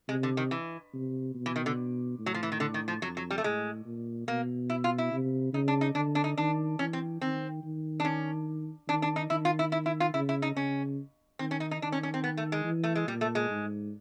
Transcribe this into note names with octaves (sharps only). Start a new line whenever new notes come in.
C3 G#3
D3
D#3
E3
C3
B2
E3
D#3
D3
A2
F#3
F3
E3
D#3
D3
D#3
F3
F2 F#3
F#3
G3
A3
A2 G#3
A#2
B2 A#3
E4
F4
E4
C3
C#3 D#4
D4
D#4
D3 D4
D4
D#4
D#3 D4
E3 C#4
C4
D#3 C4
D#3
D4
C#4
D#3 D4
D4
D#4
D#3 E4
F4
E4
E4
E4
F4
C#3 E4
E4
D#4
C#3 C#4
D#3 C4
C#4
D#4
D#4
D#3 D4
C#4
C#4
C4
B3
A3
G#3
E3
A3
G#3
A#2 G3
A3
G#3
G#2